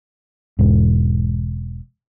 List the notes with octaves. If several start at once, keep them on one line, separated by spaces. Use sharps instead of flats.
E1 G#2